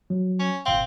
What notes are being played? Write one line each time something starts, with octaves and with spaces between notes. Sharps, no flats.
F#3
C#4
G1 A#2 C4 F5